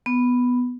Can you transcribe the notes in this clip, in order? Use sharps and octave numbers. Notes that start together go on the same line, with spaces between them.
B3